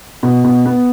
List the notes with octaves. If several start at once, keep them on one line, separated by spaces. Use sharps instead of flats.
B2
B2
B3